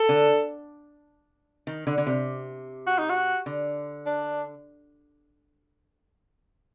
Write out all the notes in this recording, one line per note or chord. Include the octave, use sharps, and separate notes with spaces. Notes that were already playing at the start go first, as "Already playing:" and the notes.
Already playing: A4
D3
D#3
D3
D3
C3
F#4
D#4
F#4
D3
D4